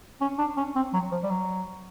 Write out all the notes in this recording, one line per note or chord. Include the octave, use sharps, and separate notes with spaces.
C#4
D4
C#4
C4
F#3
F3
G3
F#3